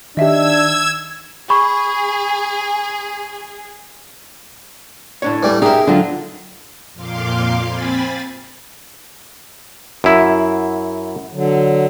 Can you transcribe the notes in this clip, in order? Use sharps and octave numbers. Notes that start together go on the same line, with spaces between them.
D#3 D4 G4 D#5 E5 E6 G#6
G#4 B5 C#6
A2 D4 C#5
E3 G3 A3
D#4 G4 G#4 A#4 E5 G5
D3 F#3 D4 F4
F2 A#2 F5 C6 D6
C4 G#5 B5 A6
F#2 E4
D3 F#3